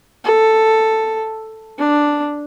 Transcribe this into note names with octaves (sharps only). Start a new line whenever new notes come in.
A4
D4